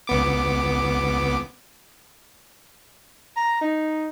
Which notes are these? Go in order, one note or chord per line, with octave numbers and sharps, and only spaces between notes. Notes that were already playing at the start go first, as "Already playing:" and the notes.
C#2 B3 D6
A#5
D#4